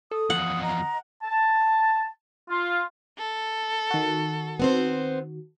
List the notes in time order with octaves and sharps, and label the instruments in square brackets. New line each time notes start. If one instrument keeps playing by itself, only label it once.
[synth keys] A4 [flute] D#6
[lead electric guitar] E2 F3 [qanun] F#5
[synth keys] D#5 [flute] A#5
[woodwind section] A5
F4
[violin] A4
[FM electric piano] D#3 F#4
[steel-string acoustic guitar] B3 C4 C5